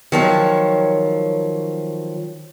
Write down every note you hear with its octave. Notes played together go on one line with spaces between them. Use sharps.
D#3 F3 F#3 C#5